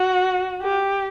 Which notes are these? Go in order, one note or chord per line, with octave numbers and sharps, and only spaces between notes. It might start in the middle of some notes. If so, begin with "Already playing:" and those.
Already playing: F#4
G4